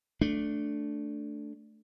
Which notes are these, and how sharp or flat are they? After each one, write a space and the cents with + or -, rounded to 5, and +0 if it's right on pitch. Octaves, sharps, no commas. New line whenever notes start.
A3 +0 D4 -5